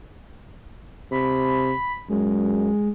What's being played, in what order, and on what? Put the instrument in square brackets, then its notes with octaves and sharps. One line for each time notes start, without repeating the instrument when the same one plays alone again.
[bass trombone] C3 [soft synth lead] B5
[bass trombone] F#2 [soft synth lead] G#3